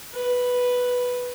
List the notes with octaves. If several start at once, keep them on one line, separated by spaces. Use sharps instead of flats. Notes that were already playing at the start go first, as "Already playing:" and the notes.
B4